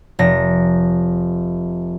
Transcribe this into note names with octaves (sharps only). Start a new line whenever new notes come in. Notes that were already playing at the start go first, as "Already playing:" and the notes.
F1 A#6